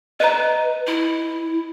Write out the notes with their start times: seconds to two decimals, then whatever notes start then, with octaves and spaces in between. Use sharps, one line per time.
0.20 B4 D#5 A#5
0.87 E4